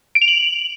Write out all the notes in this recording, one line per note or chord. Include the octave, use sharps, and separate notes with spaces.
D7
F7
F#7